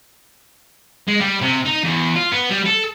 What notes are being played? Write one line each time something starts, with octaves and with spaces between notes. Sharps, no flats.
G#3
G3
C3
D#4
E2
F4
B3
G3
A4